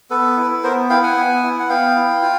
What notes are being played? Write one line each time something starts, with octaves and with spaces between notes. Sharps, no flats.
B3 A4 B4
E4
B3 A#4 C5
E4 F5 G5
F#5 G#5
B3
E4
F#5
B3 F5 G5
E4
F4